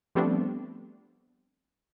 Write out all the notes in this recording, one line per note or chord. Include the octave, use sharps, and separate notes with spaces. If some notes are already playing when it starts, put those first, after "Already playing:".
F3 G3 A3 B3 C4 D4